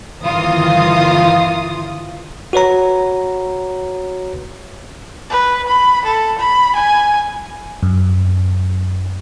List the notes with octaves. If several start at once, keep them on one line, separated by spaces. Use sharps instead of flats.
G1 D#3 E3 F4 D#6
F#4 B4 C#5 A#5
B4
B5
A4
B5
G#5
F#2